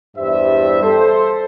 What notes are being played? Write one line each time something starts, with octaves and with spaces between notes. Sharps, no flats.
E2 G2 G3 C5 E5
A4 C5